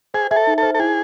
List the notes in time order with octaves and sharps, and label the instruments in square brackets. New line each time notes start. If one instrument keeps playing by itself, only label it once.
[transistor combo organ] G#4 [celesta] C5
[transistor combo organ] G#4 [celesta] E5
[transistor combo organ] A4
[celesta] D#4
[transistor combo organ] A4 [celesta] C5
[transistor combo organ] A4
[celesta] E4 [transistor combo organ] G#4